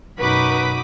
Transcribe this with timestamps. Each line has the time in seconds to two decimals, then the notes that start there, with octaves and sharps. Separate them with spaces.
0.19 F#2 B2 D#4 F#4 B4 B5 D6 D#6